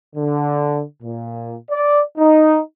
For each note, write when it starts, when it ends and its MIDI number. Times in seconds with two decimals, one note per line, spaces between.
0.16 0.81 50
1.02 1.53 46
1.71 2.01 74
2.17 2.57 63